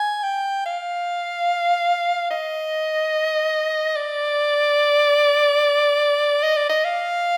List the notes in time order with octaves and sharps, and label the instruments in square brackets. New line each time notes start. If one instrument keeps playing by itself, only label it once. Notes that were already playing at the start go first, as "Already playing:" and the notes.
Already playing: [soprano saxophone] G#5
G5
F5
D#5
D5
D#5
D5
D#5
F5